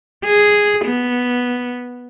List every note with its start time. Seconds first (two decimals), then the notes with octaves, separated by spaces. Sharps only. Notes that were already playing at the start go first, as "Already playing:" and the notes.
0.24 G#4
0.85 B3